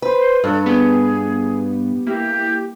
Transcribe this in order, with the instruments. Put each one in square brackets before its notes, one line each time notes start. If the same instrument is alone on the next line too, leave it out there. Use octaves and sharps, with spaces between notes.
[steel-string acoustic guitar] B4 [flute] C5
[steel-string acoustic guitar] G2 [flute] A4 [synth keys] B4 F#6
[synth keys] B3 G4 [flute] G#4
[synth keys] A#3 E4 [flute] G4